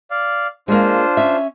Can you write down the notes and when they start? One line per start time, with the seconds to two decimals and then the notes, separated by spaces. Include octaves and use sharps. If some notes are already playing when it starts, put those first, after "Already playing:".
0.11 D5 F5
0.68 G#3 A#3 D4 F4 C5
1.17 C#4 E5